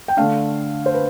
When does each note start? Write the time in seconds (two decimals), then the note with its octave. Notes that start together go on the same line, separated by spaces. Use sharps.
0.08 G5
0.17 D3 A3 D4 F5
0.86 C5
0.94 B4